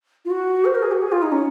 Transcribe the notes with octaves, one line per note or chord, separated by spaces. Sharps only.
F4
F#4
C5
A#4
G#4
F#4
G#4
F4
D#4
C#4